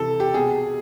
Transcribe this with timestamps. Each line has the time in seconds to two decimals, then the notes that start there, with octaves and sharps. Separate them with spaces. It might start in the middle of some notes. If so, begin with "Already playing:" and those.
Already playing: C3 E3 A4
0.20 G4
0.34 B2 G#4